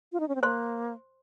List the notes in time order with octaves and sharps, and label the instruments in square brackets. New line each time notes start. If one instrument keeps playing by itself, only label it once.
[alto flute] F4
D#4
C#4
C4
[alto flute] A#3 [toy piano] C5 C6